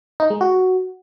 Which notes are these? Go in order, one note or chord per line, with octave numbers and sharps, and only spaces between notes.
D#4
G#3
F#4